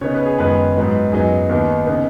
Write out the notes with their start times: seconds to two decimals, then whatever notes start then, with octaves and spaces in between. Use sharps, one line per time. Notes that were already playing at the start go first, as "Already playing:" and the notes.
0.01 C#3 B3 D#4 C#5
0.14 B4
0.26 G#4
0.38 F#2 D#3 G#3 B3 D#4 B4
0.76 G#2 F#3 B3 D#4
1.12 F#2 F#3 B3 D#4 G#4
1.49 D#2 D#3 B3 D#4
1.87 C#3 B3 D#4